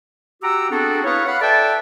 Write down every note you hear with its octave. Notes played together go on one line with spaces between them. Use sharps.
F#4 G4 F#5 G5 A#5 E6
B3 C4 D4 F#4 G#4 A4
E4 B4 C#5 F5 C#6 D#6
F5 F#5 B5
A4 B4 D5 E5 G5 A5